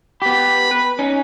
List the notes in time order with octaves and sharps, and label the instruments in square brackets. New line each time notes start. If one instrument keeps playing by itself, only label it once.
[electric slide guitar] B3 G4 [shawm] B5
[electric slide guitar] B4
C#4 D#4